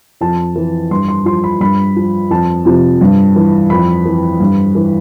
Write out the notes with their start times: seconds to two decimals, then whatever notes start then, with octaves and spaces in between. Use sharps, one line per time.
0.21 F2 A5
0.56 E3
0.91 G2 C6
1.08 C6
1.25 F3 C6
1.44 B5
1.60 G2 B5
1.96 F3
2.30 F2 A5
2.65 C3 F3
3.01 G2
3.36 E3
3.70 F2 B5
4.05 E3
4.40 G2
4.75 E3